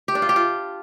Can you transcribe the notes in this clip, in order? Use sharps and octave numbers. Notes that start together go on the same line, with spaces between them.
G4
D4
F4
G4
F4